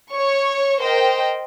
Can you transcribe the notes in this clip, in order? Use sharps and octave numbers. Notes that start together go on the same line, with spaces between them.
C#5 C#6
A#4 C5 D#5 G5